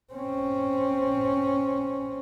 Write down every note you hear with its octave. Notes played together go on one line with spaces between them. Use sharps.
C4 C#4